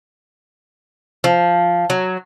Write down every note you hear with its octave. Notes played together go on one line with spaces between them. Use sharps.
F3
F#3